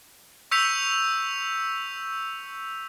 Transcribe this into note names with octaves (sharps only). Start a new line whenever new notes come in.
C#6 E6 G6 B6 C#7 F7